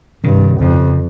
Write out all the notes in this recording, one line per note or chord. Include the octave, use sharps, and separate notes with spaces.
G2 C3 D#3
F2 C#3 F3